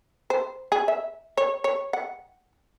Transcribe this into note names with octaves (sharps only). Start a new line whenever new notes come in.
C5
G#4
E5
C#5
C#5
F#5